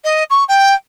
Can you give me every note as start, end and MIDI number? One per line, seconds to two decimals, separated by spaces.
0.04 0.23 75
0.30 0.44 85
0.49 0.74 79